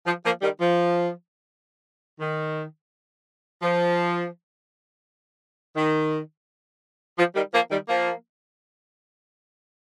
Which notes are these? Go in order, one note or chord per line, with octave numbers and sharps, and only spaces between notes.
F3
F3 A#3
D#3 G3
F3
D#3
F3
D#3
F3
D#3 G3
F3 A#3
D#3 G3
F3 A#3